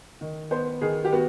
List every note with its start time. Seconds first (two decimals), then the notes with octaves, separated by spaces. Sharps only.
0.21 D#3
0.51 B3 C5
0.81 D#3 G#4
1.05 G4
1.12 B3 F#4